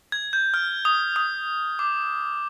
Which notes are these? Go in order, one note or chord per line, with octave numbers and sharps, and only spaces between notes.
G#6
G6
F6
D#6
D#6
D6